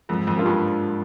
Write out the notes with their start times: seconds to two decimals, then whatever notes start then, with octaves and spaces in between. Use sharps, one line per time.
0.09 F2 G#2
0.27 F2
0.36 G3 A#3 D4 F4
0.46 G2